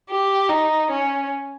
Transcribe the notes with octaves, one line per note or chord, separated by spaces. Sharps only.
G4
D#4
C#4